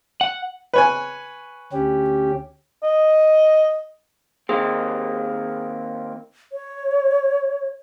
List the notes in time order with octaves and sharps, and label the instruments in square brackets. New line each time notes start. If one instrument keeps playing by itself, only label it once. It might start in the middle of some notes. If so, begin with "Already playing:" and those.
[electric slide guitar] F#5
[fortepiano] B4 C#5 G#5
[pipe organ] D2 C#4 G4
[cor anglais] D#5
[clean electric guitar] D#3 A#3 C4 [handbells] G#4
[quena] C#5